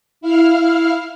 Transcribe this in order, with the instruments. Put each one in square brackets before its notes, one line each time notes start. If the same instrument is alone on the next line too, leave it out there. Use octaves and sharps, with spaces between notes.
[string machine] E4 F5 F6